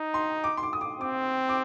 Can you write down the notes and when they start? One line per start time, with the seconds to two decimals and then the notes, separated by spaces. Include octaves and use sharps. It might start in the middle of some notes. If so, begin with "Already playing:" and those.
Already playing: D#4
0.14 C6
0.44 D6
0.57 C6
0.63 D6
0.73 D#6
0.81 D6
1.01 C4 D6
1.49 D6